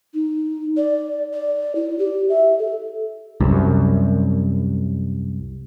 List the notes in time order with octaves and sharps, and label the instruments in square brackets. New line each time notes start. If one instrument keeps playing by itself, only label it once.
[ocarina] D#4
D5
D5
E4
G4
E5
A4
[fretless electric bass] C2 F#2